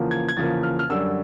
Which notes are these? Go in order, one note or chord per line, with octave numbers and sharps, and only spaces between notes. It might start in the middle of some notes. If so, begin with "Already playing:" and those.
Already playing: E2 C#3 F3 A#3
G#6
G#6
E2 C#3 F3 A#3 A6
F6
F6
F#2 D3 G3 E6